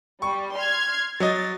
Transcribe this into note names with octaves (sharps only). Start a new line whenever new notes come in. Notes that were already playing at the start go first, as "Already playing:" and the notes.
G3 C#6
C6 F6 G#6
F#3 D#5 A6